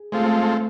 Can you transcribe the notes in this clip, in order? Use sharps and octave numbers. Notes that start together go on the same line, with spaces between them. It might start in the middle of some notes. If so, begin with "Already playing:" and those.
Already playing: G#4
G#3 A3 C4 F4 A4
A3